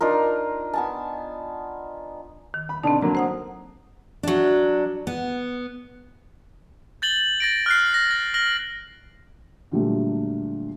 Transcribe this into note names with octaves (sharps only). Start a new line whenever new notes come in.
D4 D#4 F4 A#4
B3 G#5 A5
D#3
B5
B2 D3 C4 D4 D#4 A5
D3 F#3 A#3 A#5
C5 F#5 D#6
F#3 D4
B3
G6 A6 F#7 G7
A6 A#6 D7
F6 F#6 C7
A#6
A6
F6 A#6 F#7
A#2 D3 F#3 G3 A3